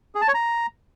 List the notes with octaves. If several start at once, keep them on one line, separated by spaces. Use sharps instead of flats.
G#4
A5
C#5
A#5